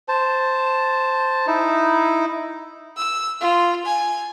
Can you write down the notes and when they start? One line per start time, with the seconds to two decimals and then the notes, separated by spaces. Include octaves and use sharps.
0.08 C5 A5
1.47 D#4 E4
2.97 E6
3.41 F4
3.85 G#5